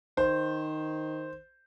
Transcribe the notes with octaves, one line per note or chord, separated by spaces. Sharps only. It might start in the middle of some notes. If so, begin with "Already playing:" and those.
D#3 C5